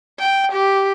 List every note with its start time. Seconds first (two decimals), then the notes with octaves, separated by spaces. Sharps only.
0.19 G5
0.53 G4